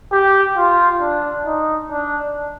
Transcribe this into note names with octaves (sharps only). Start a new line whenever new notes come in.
G4
F4
D4
D#4
D4